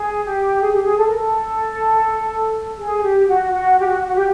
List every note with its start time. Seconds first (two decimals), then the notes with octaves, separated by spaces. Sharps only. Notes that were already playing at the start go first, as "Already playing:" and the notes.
Already playing: G#4
0.24 G4
0.61 G#4
0.72 G4
0.83 G#4
0.97 A4
1.07 A#4
1.17 A4
2.79 G#4
3.03 G4
3.27 F#4
3.52 F#4
3.79 G4
3.87 F#4
4.07 F#4
4.15 G4